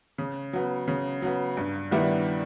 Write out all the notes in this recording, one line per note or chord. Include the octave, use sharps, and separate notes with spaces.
C#3
F#3 B3
C#3
F#3 B3
G2
D#3 G3 B3 E4